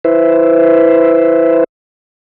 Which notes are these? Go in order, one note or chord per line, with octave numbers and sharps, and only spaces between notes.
E4 B4 C5 E5